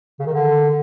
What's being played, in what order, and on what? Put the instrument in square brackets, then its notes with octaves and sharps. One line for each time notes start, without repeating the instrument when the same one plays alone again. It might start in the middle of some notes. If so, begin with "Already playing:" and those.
[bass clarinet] C#3
D#3
D3